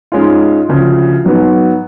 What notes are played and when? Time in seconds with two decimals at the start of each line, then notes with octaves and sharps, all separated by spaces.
0.12 G#2 G#3 C#4 F4
0.69 D2 C#3 F3
1.24 G#2 F#3 B3